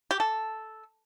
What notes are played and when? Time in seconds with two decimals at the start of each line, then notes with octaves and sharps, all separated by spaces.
0.11 G4
0.20 A4